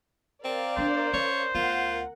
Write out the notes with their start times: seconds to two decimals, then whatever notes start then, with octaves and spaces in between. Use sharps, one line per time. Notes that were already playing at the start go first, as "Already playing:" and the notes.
0.44 C4 A#4 D5 F5
0.77 B3 D4 C5
1.14 C#4 C#5
1.55 D2 B3 F4 A#4 F#5